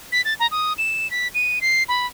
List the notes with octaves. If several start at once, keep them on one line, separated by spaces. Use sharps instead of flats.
B6
A6
A#5
D#6
E7
B6
D#7
C7
B5